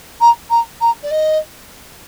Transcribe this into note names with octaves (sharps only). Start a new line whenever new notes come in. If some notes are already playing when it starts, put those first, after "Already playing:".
A#5
A#5
A#5
D5
D#5